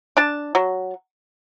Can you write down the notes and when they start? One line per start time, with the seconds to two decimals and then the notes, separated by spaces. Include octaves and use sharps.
0.17 D4 A5
0.55 F#3